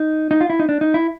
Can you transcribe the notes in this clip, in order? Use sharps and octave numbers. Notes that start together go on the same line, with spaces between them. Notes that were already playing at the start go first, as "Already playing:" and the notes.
Already playing: D#4
D#4
F4
E4
D#4
D4
D#4
E4